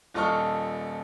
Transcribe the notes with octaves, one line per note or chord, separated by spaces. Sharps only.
D#1 F4 A4 D#5 C#6 F6